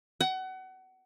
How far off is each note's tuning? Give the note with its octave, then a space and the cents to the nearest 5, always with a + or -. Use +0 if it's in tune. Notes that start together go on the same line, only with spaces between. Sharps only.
F#5 +30